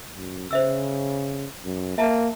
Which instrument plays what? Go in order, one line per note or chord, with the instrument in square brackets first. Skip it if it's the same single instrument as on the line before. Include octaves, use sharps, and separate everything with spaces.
[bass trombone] F#2
[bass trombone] C#3 [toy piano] C5 E5 E6
[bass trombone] F#2
[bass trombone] A#3 [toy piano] E5 A5 A#5